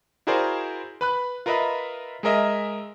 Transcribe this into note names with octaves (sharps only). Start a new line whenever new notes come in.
E4 F#4 G#4 A#4 C5 D5
B4 B5 F#6
F4 A#4 B4 D#5 E5 B5
G#3 G#4 A#4 D#5 E5